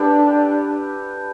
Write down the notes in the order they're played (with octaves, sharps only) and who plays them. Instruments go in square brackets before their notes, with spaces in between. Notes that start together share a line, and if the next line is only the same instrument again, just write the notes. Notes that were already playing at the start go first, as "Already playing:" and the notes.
Already playing: [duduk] D4 [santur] G4 A4 B4 D5